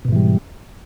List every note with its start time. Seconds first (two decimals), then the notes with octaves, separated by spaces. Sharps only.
0.05 B2
0.08 G#2
0.12 E3
0.16 G3